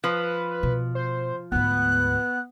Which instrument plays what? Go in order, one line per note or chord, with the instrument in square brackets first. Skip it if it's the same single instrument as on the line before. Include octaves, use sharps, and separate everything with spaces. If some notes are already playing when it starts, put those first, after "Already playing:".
[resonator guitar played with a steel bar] F3 [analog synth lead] B4
[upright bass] B2
[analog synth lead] C5
[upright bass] D2 G#2 [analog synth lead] B3 [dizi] F#6